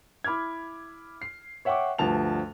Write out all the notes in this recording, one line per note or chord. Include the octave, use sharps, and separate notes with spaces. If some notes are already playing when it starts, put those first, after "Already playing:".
E4 B5 D6 F6 G#6
C7
C#5 E5 F#5 G5 C#6 D6
D2 G2 F3 A5 F7